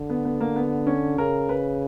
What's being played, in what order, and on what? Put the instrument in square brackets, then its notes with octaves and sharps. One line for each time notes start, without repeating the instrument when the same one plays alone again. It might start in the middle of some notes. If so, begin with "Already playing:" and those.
Already playing: [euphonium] D3
[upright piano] B3
B3
A#3
B3
C#4
[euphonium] C#3 [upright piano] A#4
[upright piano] B4